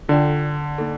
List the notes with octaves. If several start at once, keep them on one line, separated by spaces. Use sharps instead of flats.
D3 F4 A4 D5 G5
A#3 D#4 A4